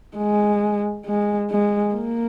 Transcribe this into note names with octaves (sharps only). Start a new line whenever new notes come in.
G#3
G#3
G#3
A#3